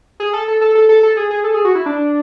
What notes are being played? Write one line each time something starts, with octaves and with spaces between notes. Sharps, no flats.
G#4
A4
A4
A4
A4
A4
A4
G#4
G#4
A4
G#4
F#4
E4
D4